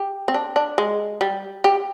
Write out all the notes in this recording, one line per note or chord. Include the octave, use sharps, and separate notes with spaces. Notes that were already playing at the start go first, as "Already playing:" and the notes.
Already playing: G4
C4
D4
D4
G#3
G3
G4